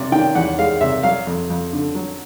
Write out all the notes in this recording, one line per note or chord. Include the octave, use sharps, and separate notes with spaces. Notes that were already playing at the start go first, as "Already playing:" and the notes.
Already playing: C3 D5
D#3 G5
E2 F#5
G#3 F5
C3 E5
F#3 F5
F2
F2
D3
F#3